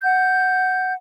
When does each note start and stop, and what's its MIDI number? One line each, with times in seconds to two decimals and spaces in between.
0.02 0.93 78
0.02 0.93 91